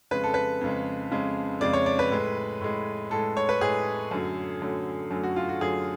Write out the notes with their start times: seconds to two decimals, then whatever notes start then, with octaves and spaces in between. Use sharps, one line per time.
0.11 F2 C#3 G#3 B4
0.24 A4
0.34 B4
0.61 F2 C#3 G#3
1.11 F2 C#3 G#3
1.61 F2 C#3 G#3 D5
1.73 C#5
1.86 D5
1.99 B4
2.11 A2 G#3
2.61 A2 G#3
3.11 A2 G#3 A4
3.37 C#5
3.49 B4
3.61 A2 G#3 G#4
4.11 F#2 D3 F#3 A3
4.61 F#2 D3 F#3 A3
5.11 F#2 D3 F#3 A3
5.23 F#4
5.36 F4
5.49 F#4
5.61 F#2 D3 F#3 A3 G#4